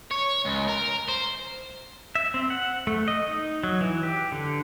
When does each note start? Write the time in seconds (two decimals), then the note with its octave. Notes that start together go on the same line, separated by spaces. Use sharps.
0.11 C#5
0.45 C#2
0.68 A#4
1.09 C5
2.15 E5
2.34 C4
2.50 F#5
2.87 A3
3.08 D#5
3.28 D#4
3.63 F#3
3.81 E3
4.03 G4
4.32 D3